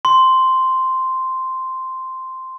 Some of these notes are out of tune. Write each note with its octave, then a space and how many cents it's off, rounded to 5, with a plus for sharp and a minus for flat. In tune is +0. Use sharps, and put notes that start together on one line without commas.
C6 -5